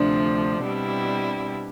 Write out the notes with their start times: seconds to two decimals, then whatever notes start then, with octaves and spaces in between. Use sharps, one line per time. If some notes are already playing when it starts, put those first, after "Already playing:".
Already playing: D2 C3 F3 D4
0.63 B2 G3 C4 E4